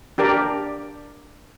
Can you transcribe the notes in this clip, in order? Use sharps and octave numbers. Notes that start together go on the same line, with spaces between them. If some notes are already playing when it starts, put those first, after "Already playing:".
D4 G4 A#4 D5